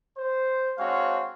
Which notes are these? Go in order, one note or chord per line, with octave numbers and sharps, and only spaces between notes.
C5
G#3 C4 D4 F#4 C#5 F5